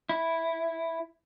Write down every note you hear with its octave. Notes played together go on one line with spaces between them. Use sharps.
E4